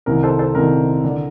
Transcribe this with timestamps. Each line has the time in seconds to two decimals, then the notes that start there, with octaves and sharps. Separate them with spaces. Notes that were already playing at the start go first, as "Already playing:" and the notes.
0.06 C2 C3 D#3 A#4
0.23 A4 C5
0.39 A4 C5
0.55 C2 C3 D#3 A#4
1.04 D3